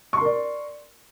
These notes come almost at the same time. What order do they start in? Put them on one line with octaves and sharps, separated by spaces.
C#6 C6 A#4 D5